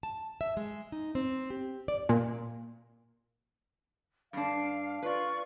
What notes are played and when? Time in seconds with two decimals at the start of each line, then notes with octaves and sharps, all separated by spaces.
0.03 A5
0.41 E5
0.57 G#3
0.92 D#4
1.15 C4
1.50 G4
1.88 D5
2.09 A#2
4.33 G2 D4 F5
5.02 F4 B4 D5 C#6